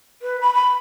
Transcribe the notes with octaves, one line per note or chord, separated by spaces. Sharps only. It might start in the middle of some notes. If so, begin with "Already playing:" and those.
B4
B5
B5